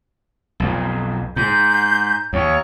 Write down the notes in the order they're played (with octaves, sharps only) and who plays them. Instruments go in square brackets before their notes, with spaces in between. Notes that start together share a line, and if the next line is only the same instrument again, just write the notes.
[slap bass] B1 F2
[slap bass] G#2 [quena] G6
[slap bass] D#2 [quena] C#5